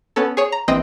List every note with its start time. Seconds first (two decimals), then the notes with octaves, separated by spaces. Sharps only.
0.16 B3 C#4 A4
0.37 G#4 C#5
0.52 A#5
0.68 A#1 E3 C4 D#5 G5